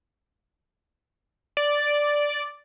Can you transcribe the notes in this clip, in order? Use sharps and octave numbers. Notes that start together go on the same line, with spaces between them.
D5